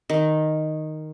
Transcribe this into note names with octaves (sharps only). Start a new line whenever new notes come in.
D#3